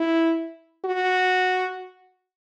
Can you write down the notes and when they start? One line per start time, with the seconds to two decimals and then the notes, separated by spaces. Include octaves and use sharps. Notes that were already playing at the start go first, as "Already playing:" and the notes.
Already playing: E4
0.85 F#4